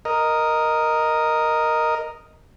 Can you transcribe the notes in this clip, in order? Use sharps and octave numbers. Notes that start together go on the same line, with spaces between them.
A#4 D#5